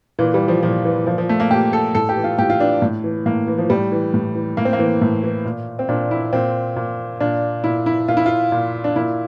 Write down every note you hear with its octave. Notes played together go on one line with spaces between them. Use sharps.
A#2 E3
G3
F3
A#2 F3
E3
A#2 F3
F3
A3
A#3
A#2 G4
A4
A2 A4
G4
E3
F4
A2 G4
F4
E3 D4
A2
E3
A2 A#3
E3
F3
A2 G3
E3
A2
E3
A2 A#3
C4
A#3
E3
A2
E3
A#2
C4
A#2 D4
E4
A#2 C4
A#2
A#2 D4
A#2 E4
E4
A#2 F4
E4
F4
A#2
D4
A#2 E4